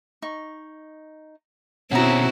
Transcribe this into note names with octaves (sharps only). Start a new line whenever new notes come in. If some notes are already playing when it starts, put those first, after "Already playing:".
D#4 C#6
B2 C4 C#4 E4 F#4 F#5 A5 A#5